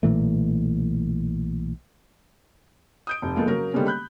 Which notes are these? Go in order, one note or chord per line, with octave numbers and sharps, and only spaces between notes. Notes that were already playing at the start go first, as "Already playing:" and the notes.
B1 A#2 E3 A3
D#6 G6 D7
F1
F3 G#3 A#3 B3 A4
C#3 F#3 A#4
D3 G3 G#3 A#3 B3 C#4
B5 F#6 G6